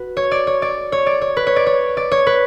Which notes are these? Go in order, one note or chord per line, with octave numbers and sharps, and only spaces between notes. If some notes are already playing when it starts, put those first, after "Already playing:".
Already playing: F#4 B4
C#5
D5
C#5
D5
C#5
D5
C#5
B4
C#5
D5
C#5
D5
C#5
B4